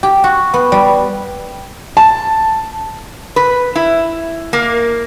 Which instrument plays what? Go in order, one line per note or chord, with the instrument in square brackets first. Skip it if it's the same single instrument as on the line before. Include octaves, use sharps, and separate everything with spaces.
[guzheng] G4
F#4
B3
G3
[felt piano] A5
[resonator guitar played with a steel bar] B4
E4
A#3